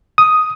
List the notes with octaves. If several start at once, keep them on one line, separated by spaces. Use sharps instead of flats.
D#6